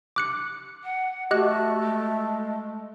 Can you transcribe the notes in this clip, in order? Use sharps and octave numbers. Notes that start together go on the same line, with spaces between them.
D6 F#6 C#7
F#5
A3 F#4 G4 D#5 F#6
G#3